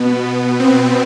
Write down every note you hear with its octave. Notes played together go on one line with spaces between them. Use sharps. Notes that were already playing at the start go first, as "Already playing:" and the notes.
Already playing: B2 B3
C4